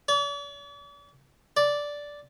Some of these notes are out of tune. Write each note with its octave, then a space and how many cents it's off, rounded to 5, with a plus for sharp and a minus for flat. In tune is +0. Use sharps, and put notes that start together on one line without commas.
D5 -45
D5 -5